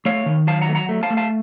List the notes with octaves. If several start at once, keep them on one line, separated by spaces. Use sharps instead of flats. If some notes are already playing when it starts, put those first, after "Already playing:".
A3 C#5 F5
D#3
F#3 F5 A5
F#5 A#5
A3
F#5 A#5
A3
F5 A5
A3
F5 A5